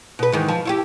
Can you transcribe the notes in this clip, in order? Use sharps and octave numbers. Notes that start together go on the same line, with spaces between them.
B2 B4
G#2 D#3 E3
F3
E4 F4 G4